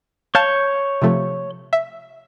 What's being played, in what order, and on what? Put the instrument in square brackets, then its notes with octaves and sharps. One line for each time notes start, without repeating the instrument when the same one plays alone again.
[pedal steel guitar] C#5 G6 [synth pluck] F5 A5
[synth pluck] C3 F3 A3
E5